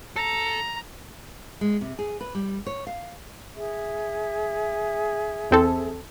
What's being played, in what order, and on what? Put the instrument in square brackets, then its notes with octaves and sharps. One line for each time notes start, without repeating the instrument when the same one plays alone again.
[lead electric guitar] A4 [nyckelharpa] A#5
[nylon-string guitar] G#3
C3
G#4
B4
G3
C#5
F5
[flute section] G#4 E5
[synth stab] E2 C4 A4